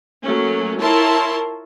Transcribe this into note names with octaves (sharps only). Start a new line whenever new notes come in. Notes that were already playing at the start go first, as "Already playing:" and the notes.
F#3 A3 A#3 C#4
E4 F4 A#4 C#5 A5 C6